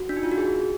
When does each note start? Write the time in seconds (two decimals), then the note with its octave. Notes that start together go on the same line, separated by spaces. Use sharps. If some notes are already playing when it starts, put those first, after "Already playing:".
Already playing: F#4
0.09 D4
0.17 D#4
0.23 F4
0.32 F#4
0.38 G#4